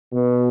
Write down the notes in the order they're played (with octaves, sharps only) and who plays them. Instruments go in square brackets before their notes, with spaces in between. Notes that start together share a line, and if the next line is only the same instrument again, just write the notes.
[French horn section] B2